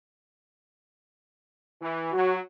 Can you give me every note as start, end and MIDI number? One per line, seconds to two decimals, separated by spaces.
1.80 2.10 52
2.13 2.36 54
2.13 2.34 66